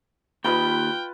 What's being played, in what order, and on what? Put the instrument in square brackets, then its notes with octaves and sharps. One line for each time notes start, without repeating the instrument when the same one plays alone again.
[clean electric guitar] D#2 B5 [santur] F4 B4 D#5 [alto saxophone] G5